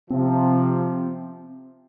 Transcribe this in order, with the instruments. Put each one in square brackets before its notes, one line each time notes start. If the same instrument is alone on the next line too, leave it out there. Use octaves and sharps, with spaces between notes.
[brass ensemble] C3 F3 [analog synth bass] C4